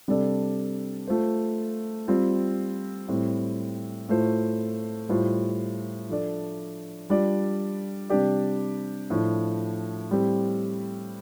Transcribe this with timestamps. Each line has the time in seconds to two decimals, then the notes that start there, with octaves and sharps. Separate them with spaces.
0.08 C3 G3 D4 A4 D5
1.07 A3 F4 C5
2.08 G3 C4 F4
3.08 A2 G3 C4 G4
4.09 A2 A3 F4 C5
5.09 A2 G3 F4 C5
6.09 F3 D4 A4 D5
7.09 G3 D4 F4 D5
8.10 C3 G3 D4 G4 D5
9.10 A2 F3 D4
10.11 A2 G3 C4 G4